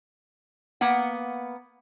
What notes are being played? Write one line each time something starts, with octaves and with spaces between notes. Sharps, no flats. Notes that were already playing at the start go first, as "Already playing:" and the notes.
A#3 B3 F#5